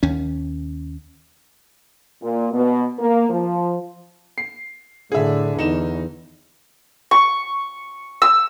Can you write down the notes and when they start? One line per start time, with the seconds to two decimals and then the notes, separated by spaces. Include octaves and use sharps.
0.03 D#2 C#4
2.22 A#2
2.52 B2
2.99 A#3
3.30 F3
4.38 C7
5.12 A2 D3 G#4 E5
5.59 E2 D#4 E7
7.11 C#6
8.22 E6